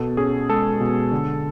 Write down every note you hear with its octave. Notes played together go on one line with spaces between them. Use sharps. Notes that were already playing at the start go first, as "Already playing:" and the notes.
Already playing: B2 A4
C#4 G#4
G#3 A4
B2
D3